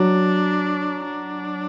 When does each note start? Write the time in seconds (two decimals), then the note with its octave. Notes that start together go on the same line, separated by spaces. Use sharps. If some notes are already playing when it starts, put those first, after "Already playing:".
Already playing: F#3 D4
1.04 D4